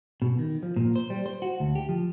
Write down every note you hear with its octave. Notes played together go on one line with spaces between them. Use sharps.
B2
D#3
F3
A#2
C5
G3
C5
F#4
D2
G4
F3